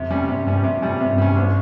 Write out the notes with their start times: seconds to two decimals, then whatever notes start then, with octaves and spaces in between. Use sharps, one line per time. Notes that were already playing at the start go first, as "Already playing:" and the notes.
Already playing: F2 C3
0.10 G3 C#4
0.28 G2 C3
0.47 G3 C#4
0.64 F2 C3
0.82 G3 C#4
1.00 G2 C3
1.18 G3 C#4
1.36 C2